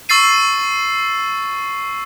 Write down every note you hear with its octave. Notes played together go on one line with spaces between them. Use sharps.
C#6 E6 A6 C7 D#7